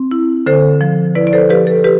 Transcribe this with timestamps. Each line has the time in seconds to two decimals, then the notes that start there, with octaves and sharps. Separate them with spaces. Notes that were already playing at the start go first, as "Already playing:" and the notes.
Already playing: C4
0.11 E4
0.46 D3 A4 C5
0.81 F3
1.15 E4 B4 D5
1.27 D5
1.33 A4 C5
1.50 F3 G4 B4
1.67 A4
1.84 G4 B4